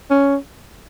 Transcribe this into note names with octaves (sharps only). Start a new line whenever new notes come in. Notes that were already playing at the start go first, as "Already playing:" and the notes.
C#4